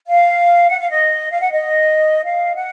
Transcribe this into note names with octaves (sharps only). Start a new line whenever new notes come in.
F5
F#5
F5
D#5
F5
F#5
D#5
F5
F#5